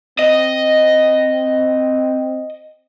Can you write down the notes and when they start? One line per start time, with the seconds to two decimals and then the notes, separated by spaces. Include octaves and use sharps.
0.19 C4 D#5